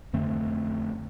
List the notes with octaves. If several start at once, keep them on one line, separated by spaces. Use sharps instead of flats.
F2 D3 A3 C4